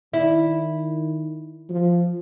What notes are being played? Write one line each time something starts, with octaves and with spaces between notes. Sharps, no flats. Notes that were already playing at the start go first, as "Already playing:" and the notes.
D#3 E4
F3